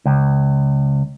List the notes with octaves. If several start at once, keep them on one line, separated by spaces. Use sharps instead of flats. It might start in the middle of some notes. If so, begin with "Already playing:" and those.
C#2